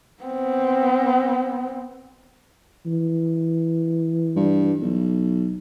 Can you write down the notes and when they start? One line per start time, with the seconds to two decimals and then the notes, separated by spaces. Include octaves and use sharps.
0.23 B3 C4
2.86 E3
4.36 G2
4.81 B1